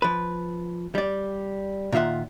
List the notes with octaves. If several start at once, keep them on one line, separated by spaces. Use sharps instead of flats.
F3 B4
G3 D5
A#2 D#3 F4 E5 F#5